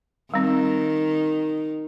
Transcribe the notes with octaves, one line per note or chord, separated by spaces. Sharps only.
D#3 G3 C4